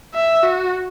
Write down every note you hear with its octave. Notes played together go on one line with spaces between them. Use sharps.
E5
F#4